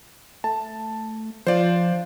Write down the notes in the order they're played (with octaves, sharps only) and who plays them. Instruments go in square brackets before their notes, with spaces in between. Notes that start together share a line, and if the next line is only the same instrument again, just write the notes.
[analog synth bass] A3 [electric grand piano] A5
[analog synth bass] F3 [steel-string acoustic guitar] D4 F4 [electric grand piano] C5 D5